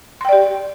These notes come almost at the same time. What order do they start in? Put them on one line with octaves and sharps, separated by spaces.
C6 G5 D5 G4